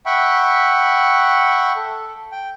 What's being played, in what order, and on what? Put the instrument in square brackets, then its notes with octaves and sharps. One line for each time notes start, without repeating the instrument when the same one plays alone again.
[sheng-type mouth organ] E5 F#5 G5 B5 C#6
A4
G5